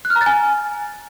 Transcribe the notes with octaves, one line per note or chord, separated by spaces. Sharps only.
F#6
F6
A#5
A6
G#5